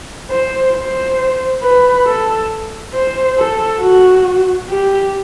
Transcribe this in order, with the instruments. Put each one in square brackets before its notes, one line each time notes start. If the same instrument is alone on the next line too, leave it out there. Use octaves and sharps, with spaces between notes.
[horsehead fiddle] C5
C5
B4
A4
C5
A4
F#4
G4